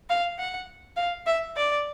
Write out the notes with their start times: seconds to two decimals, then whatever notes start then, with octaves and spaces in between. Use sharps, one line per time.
0.09 F5
0.38 F#5
0.96 F5
1.26 E5
1.56 D5